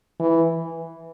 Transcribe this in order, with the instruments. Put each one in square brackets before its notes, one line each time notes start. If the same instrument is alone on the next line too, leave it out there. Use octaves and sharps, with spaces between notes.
[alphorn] E3